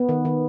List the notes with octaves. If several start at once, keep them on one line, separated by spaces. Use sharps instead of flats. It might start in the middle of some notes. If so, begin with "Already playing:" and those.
Already playing: B3
D#3
D#3